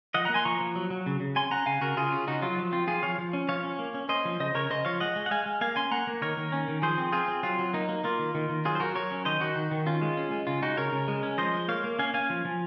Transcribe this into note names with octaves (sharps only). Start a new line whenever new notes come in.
F3 D#5 F#5
A#3 F#5 A#5
G#5 C6
F3 A#5 C#6
F3
F#3
F#3
C#3
C#3
C#4 G#5 C6
C#4 F#5 A#5
C#3 F5 G#5
C#3 F#4 A#4
C#3 F4 G#4
C#4
C#3 D#4 F#4
F#3 F4
F3
C4 F4
F3 F4 G#4
F3 C#5 F5
F3
C#4
F3 C#5 F5
C#4
A#3
C#4
C#4 C5 D#5
F3
C#3 C5 D#5
C#3 A#4 C#5
C#3 C5 D#5
F3 C#5 F5
G#3 D#5 F#5
G#3
F#5
G#3 F5 G#5
G#3
A#3 F5 G#5
C#4 G#5 C6
A#3 F#5 A#5
A#3
D#3 A#4 C#5
D#3
C#4
D#3
F3 G#4 C5
C4
C4 F4 G#4
C4
F#3 F4
F#3
A#3 D#4
A#3
A#3 F4
D#3
D#3
D#3
F#3 F4 G#4
C5
F#3 F#4 A#4
F#3 A#4 C#5
C#4
D#3 C5 D#5
D#3 D#4 F#4
D#3
D#3
C#4 F4
G#3
C#4
G#3
C#3 F4
G#3 D#4 F#4
C#3 A#4 C#5
C#3
G#3
C#4
F3 C5 D#5
G#3
A#3 C#5 F5
A#3
C#4 F5 G#5
C#4 F5 G#5
F3
F3